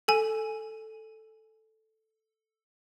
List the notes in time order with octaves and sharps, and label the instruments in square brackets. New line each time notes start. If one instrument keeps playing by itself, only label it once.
[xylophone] A4 G#5